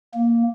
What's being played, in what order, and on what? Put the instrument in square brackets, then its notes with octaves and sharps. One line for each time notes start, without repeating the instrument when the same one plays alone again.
[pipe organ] A#3